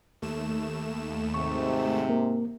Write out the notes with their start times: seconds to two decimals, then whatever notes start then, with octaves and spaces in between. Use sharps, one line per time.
0.22 D#2 A3 E7
1.34 G#2 C3 C#6
2.09 A#3 A#4